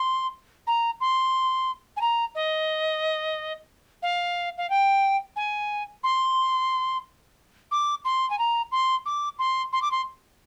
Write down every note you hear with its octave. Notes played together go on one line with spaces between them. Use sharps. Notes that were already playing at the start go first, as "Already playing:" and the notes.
Already playing: C6
A#5
C6
G#5
A#5
D#5
F5
F5
G5
G#5
C6
D6
C6
G#5
A#5
C6
D6
C6
C6
D6
C6